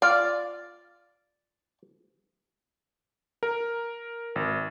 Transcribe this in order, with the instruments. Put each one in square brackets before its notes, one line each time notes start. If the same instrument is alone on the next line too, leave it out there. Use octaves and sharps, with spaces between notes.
[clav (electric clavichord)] F4 [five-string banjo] D5
[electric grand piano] A#4
G#1